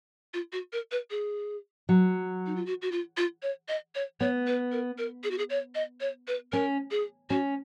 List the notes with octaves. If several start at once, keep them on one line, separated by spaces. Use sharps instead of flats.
F4
F#4
A#4
B4
G#4
F#3
D#4
F4
F#4
F#4
F4
F4
C#5
D#5
C#5
B3 C#5
B4
A#4
A#4
G#4
F#4
G#4
C#5
D#5
C#5
B4
C#4 A#4
G#4
C#4 F#4